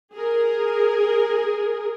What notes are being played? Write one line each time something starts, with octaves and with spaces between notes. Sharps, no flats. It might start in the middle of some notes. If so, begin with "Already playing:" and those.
G#4 A#4